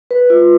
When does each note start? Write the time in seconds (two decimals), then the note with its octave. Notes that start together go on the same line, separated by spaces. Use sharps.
0.11 B4
0.30 F4